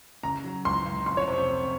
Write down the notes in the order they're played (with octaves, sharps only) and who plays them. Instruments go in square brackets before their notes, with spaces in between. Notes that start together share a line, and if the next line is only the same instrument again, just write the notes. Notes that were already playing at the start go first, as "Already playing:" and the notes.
[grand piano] C#3 [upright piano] A#5
[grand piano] F#3
[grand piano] C#2 [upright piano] C6
[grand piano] C#2
[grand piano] F2 [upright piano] C6
[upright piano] C#5
[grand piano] C3 [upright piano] C5
[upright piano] C5
[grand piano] F1